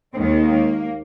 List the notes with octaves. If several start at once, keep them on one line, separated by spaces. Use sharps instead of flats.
D#2 D#3 G#3 C4
A#3